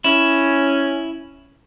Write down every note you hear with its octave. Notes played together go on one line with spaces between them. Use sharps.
C#4 E4